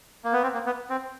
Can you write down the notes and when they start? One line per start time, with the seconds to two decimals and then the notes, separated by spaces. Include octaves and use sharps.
0.24 A#3
0.33 B3
0.43 C4
0.54 A#3
0.66 B3
0.90 C4